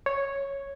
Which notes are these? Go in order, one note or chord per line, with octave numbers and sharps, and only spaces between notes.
C#5